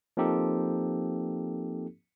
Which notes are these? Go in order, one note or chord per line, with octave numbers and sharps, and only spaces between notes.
F3 A#3 C4 D#4 G4 A4